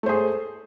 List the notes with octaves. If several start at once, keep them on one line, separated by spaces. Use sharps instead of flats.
A3 G#4 C5